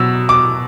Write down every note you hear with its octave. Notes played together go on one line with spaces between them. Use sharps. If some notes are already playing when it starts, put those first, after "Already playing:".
Already playing: B2 F#3 E6
D6